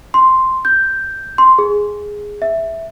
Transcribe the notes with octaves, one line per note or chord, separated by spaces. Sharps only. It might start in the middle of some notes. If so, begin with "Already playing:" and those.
C6
G6
C6
G#4
E5